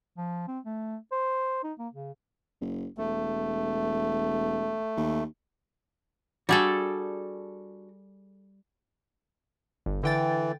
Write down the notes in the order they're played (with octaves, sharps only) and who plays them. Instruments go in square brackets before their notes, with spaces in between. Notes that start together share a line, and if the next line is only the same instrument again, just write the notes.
[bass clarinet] F3
C4
A3
C5
D#4
A#3
C#3
[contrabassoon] F#1
[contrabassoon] E1 [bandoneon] A3
[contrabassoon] D#2
[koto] G3 G#4 A4 [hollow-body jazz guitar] D4 F#4
[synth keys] G1
[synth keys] D3 G5 A6 [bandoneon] E3